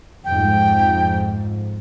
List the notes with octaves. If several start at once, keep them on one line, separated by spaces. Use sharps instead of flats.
F2 G#2 G5